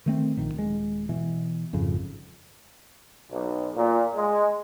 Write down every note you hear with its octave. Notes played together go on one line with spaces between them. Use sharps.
D#3 A3 C4
A#1 D#3
D#1 G#3
B2 E3
G#1 F2 C#3
B1
A#2
G#3